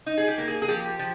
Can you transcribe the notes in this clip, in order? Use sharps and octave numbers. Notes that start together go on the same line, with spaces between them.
D#4
G#4
G4
A#3
G#4
G#4
F3 G4
F3